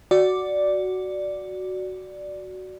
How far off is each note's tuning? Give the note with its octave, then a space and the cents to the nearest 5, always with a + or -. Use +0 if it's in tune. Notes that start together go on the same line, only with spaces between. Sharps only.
F#4 +5 D5 +0